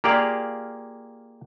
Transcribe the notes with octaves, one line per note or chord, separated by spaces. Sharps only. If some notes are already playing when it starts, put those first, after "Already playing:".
A#3 F4 G4 G#4 D5 F5